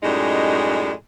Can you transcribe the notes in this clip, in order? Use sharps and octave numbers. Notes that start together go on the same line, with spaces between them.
F#2 A2 G3 G#3 D#4